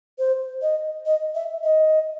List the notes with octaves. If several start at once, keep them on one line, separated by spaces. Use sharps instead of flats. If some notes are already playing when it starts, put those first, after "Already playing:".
C5
D#5
D#5
E5
D#5